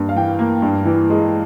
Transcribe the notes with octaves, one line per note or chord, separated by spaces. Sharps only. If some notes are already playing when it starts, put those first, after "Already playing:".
Already playing: G2 A#3
F5
E3 G5
A#3
G2
E3
G#3